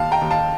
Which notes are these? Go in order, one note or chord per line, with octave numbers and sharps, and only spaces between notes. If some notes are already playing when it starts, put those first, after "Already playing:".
Already playing: D#2 F5 A5
G5 A#5
D#2
F5 A5